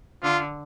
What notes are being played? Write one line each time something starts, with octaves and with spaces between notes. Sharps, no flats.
D3 F4